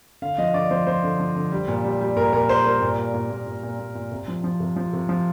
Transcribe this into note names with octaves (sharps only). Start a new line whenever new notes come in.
D3 F5
F3 D#5
D3 D5
F3 C5
F3 C5
D3
F3
D3
G3
A#2
G3
G3
A#2 A#4
A#2 A#4
A#2 C5
G3 A#4
A#2
A#2
A#2
A#2
A#2
A#2
A#2
A#2
C3
F3
F3
C3
F3
C3
F3